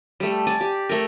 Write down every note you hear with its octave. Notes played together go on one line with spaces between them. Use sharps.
G3 A3
D5 G#5 A5
G4
A3 A#4